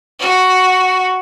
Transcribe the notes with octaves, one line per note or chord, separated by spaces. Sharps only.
F#4